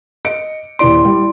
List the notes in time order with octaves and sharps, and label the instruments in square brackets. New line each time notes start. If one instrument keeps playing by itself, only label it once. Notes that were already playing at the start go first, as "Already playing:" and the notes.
[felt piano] D#5 C#7 D7
[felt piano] D#1 D7 [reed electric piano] E4 D5 C6
[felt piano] G3